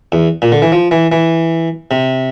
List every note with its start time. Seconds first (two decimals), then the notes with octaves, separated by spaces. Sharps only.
0.12 E2
0.42 A#2
0.52 D3
0.62 E3
0.72 F3
0.91 E3
1.12 E3
1.91 C3